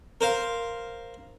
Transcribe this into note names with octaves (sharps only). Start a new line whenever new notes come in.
A#4 C5 F5